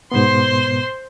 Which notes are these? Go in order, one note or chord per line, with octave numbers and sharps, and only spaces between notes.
G#2 B2 B3 C5 C6